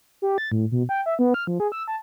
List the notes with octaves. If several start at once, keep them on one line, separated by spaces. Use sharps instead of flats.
G4
A6
A2
B2
G5
E5
B3
F6
F3
G#4
E6
A5